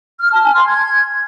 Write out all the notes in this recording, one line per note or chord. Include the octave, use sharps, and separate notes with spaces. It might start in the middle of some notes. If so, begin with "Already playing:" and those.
F6
A5
G#5
C6
G#6